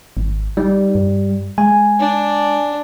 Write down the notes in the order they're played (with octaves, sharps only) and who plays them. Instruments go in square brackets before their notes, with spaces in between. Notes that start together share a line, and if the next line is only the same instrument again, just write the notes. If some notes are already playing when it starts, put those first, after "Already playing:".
[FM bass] G#1
[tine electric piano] G3 [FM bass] D#4
[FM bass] G2
[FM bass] G#3 [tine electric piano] G#5
[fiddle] D4